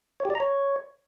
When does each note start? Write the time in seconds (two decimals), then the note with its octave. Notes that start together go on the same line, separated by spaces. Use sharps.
0.20 C#5
0.25 G4
0.30 D5
0.35 A#5
0.40 C#5